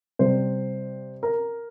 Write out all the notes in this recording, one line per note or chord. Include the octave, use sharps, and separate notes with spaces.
C3 G3 C4 C5
A#4